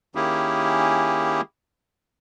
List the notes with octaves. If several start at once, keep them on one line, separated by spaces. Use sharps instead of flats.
D#3 A#3 C#4 E4 G4 G#4